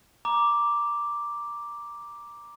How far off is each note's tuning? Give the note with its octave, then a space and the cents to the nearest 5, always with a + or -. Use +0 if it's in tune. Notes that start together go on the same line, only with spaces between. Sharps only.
A#5 +15 D6 +0